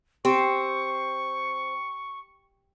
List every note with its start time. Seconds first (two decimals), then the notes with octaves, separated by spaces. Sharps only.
0.25 C4 G4 C#6